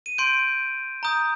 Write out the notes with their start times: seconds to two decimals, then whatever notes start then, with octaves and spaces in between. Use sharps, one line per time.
0.06 D#7
0.18 C6 G6 D7
1.03 A#5 D#6 G6